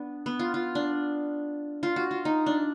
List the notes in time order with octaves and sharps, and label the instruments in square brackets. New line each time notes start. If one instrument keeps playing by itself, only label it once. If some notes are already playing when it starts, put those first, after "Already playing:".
Already playing: [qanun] B3 D4
B3
F4
F4
D4
F4
F#4
F4
D#4
D4